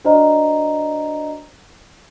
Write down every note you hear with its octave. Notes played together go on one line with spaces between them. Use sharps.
D4 F#4 C5 D5 D#5 A#5